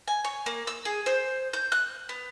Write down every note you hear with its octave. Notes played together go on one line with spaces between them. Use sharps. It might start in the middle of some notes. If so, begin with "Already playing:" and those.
G#5
C#5
A#3
E6
G#4
C5
G6
F#6
B3